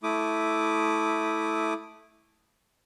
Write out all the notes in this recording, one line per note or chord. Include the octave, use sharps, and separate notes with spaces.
A3 E4 D6 D#6